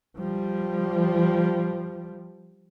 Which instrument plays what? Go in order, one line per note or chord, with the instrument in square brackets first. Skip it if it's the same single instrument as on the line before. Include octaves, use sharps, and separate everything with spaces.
[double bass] F3 G3